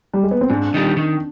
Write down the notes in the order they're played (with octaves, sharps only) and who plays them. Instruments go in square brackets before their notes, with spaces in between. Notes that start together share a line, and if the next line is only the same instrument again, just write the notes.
[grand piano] G3
G#3
B3
C4
[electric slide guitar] G#2 [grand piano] D4
[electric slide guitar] D#3 G3
D#3